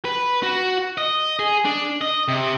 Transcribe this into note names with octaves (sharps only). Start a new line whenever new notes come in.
B4
F#4
D#5
G#4
D4
D#5
C3